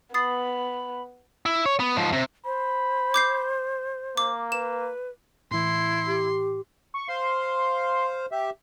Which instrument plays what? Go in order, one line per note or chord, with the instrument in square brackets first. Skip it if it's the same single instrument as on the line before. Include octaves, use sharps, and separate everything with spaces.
[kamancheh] B3 [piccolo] B5 [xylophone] D#6 A6 C7
[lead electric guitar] E4
C#5
B3
G#2 F3
C3
[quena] C5 [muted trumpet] B5
[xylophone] D6 G6 C7
[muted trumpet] A#3 [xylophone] D6
[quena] B4 [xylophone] E7
[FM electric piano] A2 E3 [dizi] E4 [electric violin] C6
[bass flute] G4
[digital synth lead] C#6
[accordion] C5 F5 [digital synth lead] C6
[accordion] G4 E5